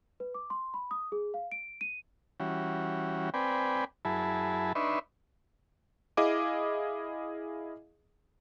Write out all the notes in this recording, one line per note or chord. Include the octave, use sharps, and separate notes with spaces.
B4
D6
C6
B5
D#6
G#4
F5
D7
D#7
E3 G3 C#4 F#4
C4 B4 D5 G5 G#5
F#2 E4 G#4 A5 B5
D4 D#4 B4 E5 C6 C#6
E4 G#4 D#5 F5 D6